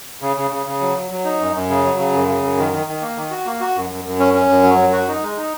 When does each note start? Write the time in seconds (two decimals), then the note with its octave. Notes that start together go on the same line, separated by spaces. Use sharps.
0.22 C#3
0.36 C#3
0.51 C#3
0.66 C#3
0.81 F#3
0.96 F#3
1.11 F#3
1.25 D#4
1.40 F#2
1.54 F#2
1.69 C#3
1.84 F#3
1.99 C#3
2.13 F#2
2.28 C#3
2.43 F#2
2.58 D#3
2.72 D#3
2.87 D#3
3.02 A#3
3.17 D#3
3.30 F#4
3.46 A#3
3.60 F#4
3.75 F#2
3.90 F#2
4.05 F#2
4.20 C#4
4.34 C#4
4.49 F#2
4.63 F#3
4.78 F#2
4.93 F#4
5.08 D#4
5.22 G#3
5.37 D#4